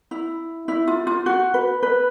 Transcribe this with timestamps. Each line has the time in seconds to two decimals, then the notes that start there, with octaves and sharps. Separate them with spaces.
0.11 E4
0.68 E4
0.87 F4
1.07 F4
1.26 F#4
1.54 B4
1.83 B4